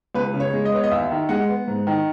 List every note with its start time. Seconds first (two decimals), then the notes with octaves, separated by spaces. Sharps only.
0.15 C#2 B4
0.34 C#3
0.40 C#5
0.54 G#3
0.65 D#5
0.72 B3 C#5
0.84 D#5
0.91 D#2 E5
1.11 D#3
1.29 G#3 F#5
1.49 B3
1.68 G#2
1.87 D#3